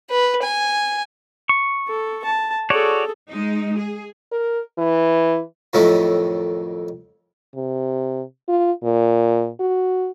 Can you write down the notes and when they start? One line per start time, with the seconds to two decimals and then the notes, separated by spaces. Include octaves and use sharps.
0.11 B4
0.43 G#5
1.49 C#6
1.88 A4
2.24 A5
2.70 F#4 G#4 A4 C#5 D5
3.30 G#3 D#4
3.77 G#4
4.32 A#4
4.78 E3
5.73 F2 A2 D#3 F#3 A3 E4
7.55 C3
8.48 F4
8.83 A#2
9.60 F#4